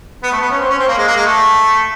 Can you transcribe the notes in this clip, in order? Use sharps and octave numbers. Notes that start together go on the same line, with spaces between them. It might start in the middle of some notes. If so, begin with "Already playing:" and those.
B3
A3
B3
C#4
C4
C#4
C4
A#3
G#3
A#3
G#3
A3